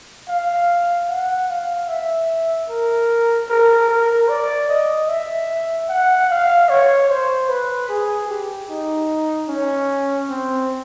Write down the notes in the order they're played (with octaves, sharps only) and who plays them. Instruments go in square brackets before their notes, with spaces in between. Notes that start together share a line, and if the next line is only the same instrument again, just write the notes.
[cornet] F5
F#5
F5
E5
A#4
A#4
A#4
D5
D#5
E5
F#5
F5
C#5
C5
B4
G#4
G4
D#4
C#4
C4